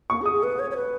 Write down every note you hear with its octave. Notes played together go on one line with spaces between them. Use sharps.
A#3 C#6
G#4
D#6
G#4
B4
C#5
C#5
B4